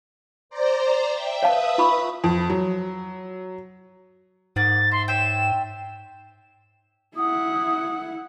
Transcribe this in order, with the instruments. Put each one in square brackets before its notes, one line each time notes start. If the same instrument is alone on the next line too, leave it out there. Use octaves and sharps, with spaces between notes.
[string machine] C5 D5 A#5
E5 G5
[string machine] B4 E5 D#6 [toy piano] C#5 F5 A5
[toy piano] F4 B5 C#6
[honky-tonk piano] F2
F#3
[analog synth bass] G#2 [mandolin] A#3 F#5 D#6 [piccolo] A6
[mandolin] E5 [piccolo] C6
[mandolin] C#5 E5 G5 [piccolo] E7
[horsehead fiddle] E4 F#5 [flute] D#6